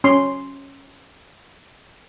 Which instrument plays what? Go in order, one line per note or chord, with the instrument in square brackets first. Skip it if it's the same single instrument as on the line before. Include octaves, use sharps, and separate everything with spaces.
[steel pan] C#4 C6